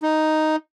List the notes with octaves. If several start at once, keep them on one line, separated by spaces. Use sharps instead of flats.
D#4